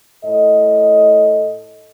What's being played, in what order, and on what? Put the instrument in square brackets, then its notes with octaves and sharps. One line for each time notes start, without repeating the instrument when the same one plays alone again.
[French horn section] A2 A4 D#5